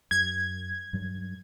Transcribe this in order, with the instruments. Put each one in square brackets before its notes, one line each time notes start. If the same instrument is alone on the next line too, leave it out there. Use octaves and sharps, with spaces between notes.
[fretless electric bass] F#2 [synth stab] G#6
[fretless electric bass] G2 F#3 G3